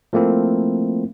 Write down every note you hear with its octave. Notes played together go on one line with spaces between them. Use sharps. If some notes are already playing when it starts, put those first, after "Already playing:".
F3 A3 A#3 C4 E4